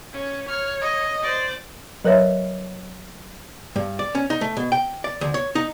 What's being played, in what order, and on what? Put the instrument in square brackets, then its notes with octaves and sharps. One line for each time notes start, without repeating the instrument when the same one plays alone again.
[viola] C#4
[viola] C#5 [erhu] F6
[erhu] D#5
[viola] C5 D5
[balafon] F#3 A#4 B4 C#5 E5
[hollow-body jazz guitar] G2
D5
C#4
D#4
A3
B2
G5
D5
D2
C#5
D#4